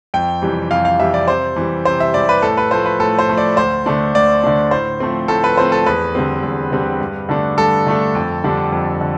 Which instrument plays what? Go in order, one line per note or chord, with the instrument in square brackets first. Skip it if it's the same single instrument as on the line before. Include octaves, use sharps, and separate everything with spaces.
[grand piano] F2 G5
C3 E3 G3
F2 F5
F5
C3 E3 G3 E5
D5
C3 C5
E3 G3
C3 C5
E5
E3 G3 D5
B4
A2 A4
B4
F3 A3 C5
B4
A2 A4
C5
F3 A3
D5
D2 C5
D3 A3 D4
D2 D5
D3 A3 D4
A2 C5
F3 A3 C4
A2 A4
B4
F3 A3 C4 C5
A4
E2 B4
D3 G3 C4
E2
D3 G3 C4
G2
D3 A3 D4
G2 A4
D3 A3 D4
F2
D3 G3 D4
F2
D3